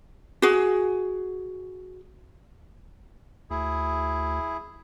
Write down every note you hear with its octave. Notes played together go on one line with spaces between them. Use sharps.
F#4 G#4
D2 E4 G#4